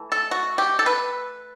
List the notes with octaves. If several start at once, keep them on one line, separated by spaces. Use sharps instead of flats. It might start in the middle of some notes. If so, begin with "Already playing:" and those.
Already playing: E3 A3
A4
F#4
G4
A4
B4